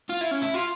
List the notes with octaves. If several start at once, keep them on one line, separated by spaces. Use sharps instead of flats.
F4
E4
C#4
E4
F4